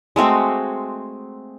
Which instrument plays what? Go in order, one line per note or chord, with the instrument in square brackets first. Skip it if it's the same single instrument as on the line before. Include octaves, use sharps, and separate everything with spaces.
[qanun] G#3 A3 C4 F#4